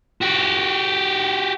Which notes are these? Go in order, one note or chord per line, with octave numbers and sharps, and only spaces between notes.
F#4 G4